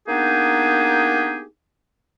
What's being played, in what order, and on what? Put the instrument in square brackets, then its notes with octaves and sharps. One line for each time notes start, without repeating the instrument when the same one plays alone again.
[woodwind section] A#3 B3 D4 D#4 G4 G#4